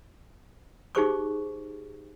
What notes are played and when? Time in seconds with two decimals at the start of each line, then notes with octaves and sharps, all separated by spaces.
0.95 D#4 G4 G#4 C5 C#6 D6